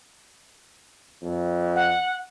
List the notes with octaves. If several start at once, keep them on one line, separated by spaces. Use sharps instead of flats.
F2
F#5